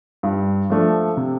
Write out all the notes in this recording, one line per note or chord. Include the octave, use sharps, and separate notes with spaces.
G2
F3 A3 D4
C3